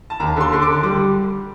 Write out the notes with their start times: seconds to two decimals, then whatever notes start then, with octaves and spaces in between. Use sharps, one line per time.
0.10 A5
0.20 D#2 A#5
0.36 D3 C6
0.52 D3 C6
0.62 D6
0.67 D3
0.83 G3 D6